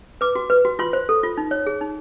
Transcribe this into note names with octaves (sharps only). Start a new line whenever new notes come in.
B4 D6
F#4
B4
F#4
F4 C6
C5
A4
F4
D#4
C#5
G#4
D#4